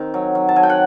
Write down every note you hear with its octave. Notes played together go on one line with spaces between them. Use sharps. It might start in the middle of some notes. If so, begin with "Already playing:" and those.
Already playing: D#3 C4
F#3
F#3
A5
F#3 G#5
G5
F#5